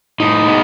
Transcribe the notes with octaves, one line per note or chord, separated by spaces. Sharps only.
A2 D#4
G#3 B3